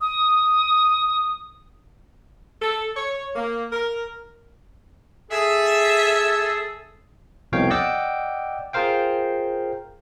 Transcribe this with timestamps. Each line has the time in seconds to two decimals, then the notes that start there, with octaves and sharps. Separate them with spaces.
0.01 D#6
2.62 A4
2.96 C#5
3.35 A#3
3.71 A#4
5.31 G#4 A4 E5
7.52 C2 F2 B2 C#5 F5 G5
7.70 D5 D#5 F#5 G5 D6 E6
8.73 F4 G#4 A#4 C5 F5 G5